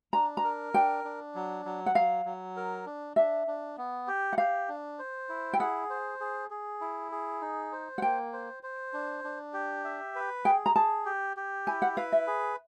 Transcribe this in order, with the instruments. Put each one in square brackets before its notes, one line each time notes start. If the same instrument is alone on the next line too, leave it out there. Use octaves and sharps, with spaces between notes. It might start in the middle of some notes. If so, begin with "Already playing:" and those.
[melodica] D4 [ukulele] A#5
[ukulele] A#5
[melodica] A#4
[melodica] D4 [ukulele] G5
[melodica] D4
F#3
F#3
[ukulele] F#5
[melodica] F#3 [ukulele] F5
[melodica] F#3
A#4
D4
[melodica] D4 [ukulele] E5
[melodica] D4
B3
G4
[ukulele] F#5
[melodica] G4 [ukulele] F5
[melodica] D4
C5
E4
[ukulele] G5
[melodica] G#4 [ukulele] F#5
[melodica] C5
G#4
G#4
E4
G#4
D#4
C5
[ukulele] F#5
[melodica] A#3 [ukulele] G5
[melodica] C5
C5
D4
D4
G4
E5
B4
[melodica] G#4 [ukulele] G5
[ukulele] A#5
[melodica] G#4 [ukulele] A5
[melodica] G4
G4
[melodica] E4 [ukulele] G#5
[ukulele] F#5
[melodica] B4 [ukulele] F5
[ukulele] E5
[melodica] G#4